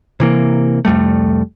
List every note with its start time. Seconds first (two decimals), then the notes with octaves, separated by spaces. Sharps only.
0.20 C3 E3 A#3
0.85 C2 F2 G3 A3